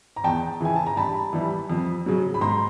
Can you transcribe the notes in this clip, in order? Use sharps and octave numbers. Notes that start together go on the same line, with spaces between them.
A#5
E2 G5 A5
C#3 E3 G#5
A5
A#5
G2 A5 B5
E3 G3
F2
C#3 F#3
B5
G#2 A#5 C6